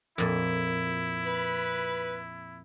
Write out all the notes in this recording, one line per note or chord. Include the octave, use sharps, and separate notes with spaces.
F2 A#2 E4
B4